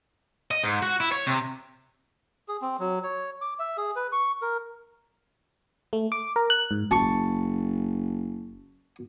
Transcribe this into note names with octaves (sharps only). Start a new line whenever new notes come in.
D#5
G#2
F#4
E4
C#5
C3
G#4
C4
F#3
C#5
D6
E5
G#4
B4
C#6
A#4
A3
D6
A#4
F#6
G#2
F#1 A5 C#6